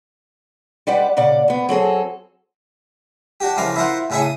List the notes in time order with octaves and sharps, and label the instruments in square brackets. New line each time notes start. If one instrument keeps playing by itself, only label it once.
[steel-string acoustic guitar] G3 G#3 G4 B4 D5 F#5
A#2 C#3 D5 F#5
D2 B3
F#3 C4 G#4 A4
[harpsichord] D4 F#4 G4
C#2 E3 F3 A#4 F5 D6
E4 F4 A#4 C5 F#5
A2 C#3 E4 G#4 E5 C#6
D#6